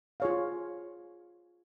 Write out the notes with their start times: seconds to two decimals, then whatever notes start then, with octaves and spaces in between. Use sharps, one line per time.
0.20 F4 G#4 C#5 F5